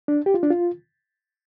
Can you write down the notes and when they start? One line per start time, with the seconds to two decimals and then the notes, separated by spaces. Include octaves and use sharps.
0.08 D4
0.26 G4
0.34 F4
0.43 D4
0.50 F4